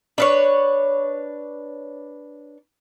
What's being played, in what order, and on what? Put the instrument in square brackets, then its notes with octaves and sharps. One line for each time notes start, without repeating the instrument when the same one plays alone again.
[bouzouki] D4 B4 C#5